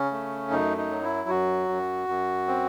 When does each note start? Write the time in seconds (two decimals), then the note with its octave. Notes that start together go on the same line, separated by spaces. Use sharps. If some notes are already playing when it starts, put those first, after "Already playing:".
Already playing: C#3 C#4
0.11 A3
0.51 F#2 D#4
0.77 D#4
0.91 F#3
1.03 E4
1.29 F#2 F#4
1.69 F#2
2.09 F#2
2.48 C4